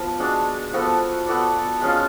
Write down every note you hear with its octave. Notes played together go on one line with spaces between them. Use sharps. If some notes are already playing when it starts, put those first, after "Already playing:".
Already playing: F3 B3
G#3 D4 F#4
F3 B3 F#4 A4
B3 F#4 A4 D5
G#3 C#4 F4